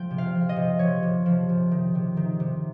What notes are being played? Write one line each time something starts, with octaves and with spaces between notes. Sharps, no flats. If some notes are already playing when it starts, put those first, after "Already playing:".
Already playing: F3 G5
C3
F5
F3
D#5
C3
F3 C#5
C3
F3
C3
D#3
C3
D#3
C3